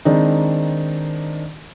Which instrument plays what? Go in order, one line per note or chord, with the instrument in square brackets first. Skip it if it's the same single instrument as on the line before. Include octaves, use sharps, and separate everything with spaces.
[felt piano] D#3 G#3 C4 D4 D#4